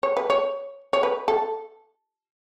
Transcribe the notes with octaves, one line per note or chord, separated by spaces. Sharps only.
C#5
B4
C#5
C#5
B4
A4